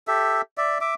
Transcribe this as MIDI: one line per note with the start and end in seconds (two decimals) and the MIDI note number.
0.08 0.41 67
0.08 0.41 69
0.08 0.41 76
0.58 0.78 74
0.58 0.78 76
0.81 0.94 76
0.81 0.94 86